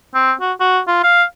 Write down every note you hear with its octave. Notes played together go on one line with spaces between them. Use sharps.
C4
F#4
F#4
F4
F5